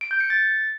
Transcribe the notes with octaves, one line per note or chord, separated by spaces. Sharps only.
D7
G6
C#7
A6